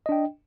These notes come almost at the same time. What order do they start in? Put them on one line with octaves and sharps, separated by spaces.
D#5 D4 G5